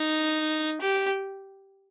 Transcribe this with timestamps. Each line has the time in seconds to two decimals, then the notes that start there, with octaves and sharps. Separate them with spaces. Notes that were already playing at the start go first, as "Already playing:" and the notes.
Already playing: D#4
0.81 G4